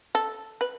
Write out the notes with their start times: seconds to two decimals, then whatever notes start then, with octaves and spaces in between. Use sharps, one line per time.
0.15 A4
0.61 B4